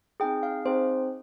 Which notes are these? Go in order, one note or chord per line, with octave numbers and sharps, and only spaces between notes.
C4 D#4 G#4 G5
F5
C4 D#4 G#4 C5